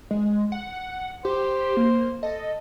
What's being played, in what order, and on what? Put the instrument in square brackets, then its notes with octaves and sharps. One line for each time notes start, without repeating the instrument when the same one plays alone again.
[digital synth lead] G#3
F#5
[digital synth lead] G4 [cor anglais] C5
[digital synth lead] A#3
[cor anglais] A4 [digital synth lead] D#5